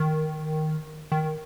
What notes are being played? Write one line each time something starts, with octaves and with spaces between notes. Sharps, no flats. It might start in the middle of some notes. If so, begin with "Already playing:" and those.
Already playing: D#3
D#3